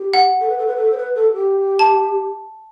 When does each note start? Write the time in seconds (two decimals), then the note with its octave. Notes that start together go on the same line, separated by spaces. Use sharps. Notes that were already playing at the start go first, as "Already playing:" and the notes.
Already playing: G4
0.14 F#5
0.40 A4
0.49 B4
0.58 A4
0.67 B4
0.76 A4
0.92 C5
0.97 B4
1.15 A4
1.34 G4
1.79 A5